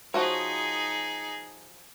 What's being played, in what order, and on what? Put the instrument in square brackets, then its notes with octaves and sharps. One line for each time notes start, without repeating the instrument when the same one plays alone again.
[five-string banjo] F3 F#4 C#5 [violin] D#4 G#4